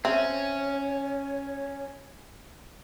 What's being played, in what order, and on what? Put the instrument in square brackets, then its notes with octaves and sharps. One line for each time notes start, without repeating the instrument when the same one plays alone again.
[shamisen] C4 [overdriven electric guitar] C#4 [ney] C#5 [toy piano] E5